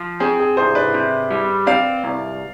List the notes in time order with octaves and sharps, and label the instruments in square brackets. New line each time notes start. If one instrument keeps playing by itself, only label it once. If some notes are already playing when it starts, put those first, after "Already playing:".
Already playing: [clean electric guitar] F3
[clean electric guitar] C4 [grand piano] G#4
[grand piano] G#4
[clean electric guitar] C2 [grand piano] G#4 C5
[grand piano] B4 D5
[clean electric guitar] C3
G3
[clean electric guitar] C4 [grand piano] D5 F5
[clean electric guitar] C2